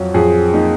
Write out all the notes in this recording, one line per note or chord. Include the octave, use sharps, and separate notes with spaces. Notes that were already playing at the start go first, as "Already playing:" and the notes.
Already playing: F2 F#3
F2 G#4
A#3 D#4